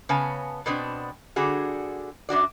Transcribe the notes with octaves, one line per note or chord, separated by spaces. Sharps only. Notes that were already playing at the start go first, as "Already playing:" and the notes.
C#3 B3 G#5 A5
B2 B3 C4 D4
D3 G3 F#4 G#4
F#2 D4 F#4 D5